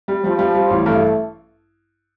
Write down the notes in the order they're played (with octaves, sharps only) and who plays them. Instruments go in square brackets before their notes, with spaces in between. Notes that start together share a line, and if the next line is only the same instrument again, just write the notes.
[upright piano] G3
[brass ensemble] F3 [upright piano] G3
[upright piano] G3
G3
A1
[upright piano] G2 [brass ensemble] A3